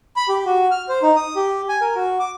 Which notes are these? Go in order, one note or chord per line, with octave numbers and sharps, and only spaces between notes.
B5
G4
F#4
F6
C5
D#4
D#6
G4
G#5
A#4
F#4
D6